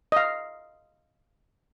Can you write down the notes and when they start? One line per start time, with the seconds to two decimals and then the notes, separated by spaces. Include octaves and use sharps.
0.12 D#5 F5